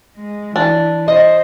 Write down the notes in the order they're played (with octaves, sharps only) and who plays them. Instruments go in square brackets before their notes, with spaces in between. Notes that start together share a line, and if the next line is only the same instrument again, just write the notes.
[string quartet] G#3
[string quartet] E3 [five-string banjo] D4
[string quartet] C5 [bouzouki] D#5